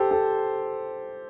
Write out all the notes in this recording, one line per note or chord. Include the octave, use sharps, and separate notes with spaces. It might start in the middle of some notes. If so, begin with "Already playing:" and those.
Already playing: G4 A4 C5
A4